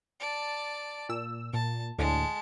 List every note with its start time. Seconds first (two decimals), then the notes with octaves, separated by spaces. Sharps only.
0.20 D5 A5
1.09 A#2 E6
1.53 A#2 A5
1.98 D2 A2 D3 G#3 A5